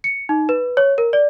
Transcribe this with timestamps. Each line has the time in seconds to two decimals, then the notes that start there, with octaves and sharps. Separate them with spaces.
0.04 C#7
0.29 D#4
0.49 B4
0.77 C#5
0.98 A#4
1.13 D5